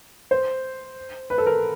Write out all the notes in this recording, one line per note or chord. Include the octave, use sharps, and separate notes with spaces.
C5
B4
A4
A#4